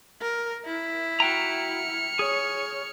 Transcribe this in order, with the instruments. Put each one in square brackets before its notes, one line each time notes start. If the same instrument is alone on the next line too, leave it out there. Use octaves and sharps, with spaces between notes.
[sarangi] A#4
E4
[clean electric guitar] F#4 G5 A#5 [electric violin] F6 C#7
[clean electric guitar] G#4 [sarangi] C#5